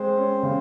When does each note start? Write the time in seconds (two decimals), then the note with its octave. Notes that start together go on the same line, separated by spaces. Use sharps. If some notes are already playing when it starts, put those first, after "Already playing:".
Already playing: G#3 C4 C5
0.17 C#4
0.43 C#3